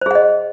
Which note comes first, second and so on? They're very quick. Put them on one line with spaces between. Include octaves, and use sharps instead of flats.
C5 G#4 F#5 D#5